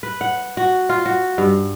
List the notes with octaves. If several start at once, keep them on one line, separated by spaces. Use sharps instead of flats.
B4
F#5
F#4
F4
F#4
G2